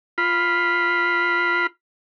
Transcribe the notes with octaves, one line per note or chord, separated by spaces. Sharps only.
F4 B5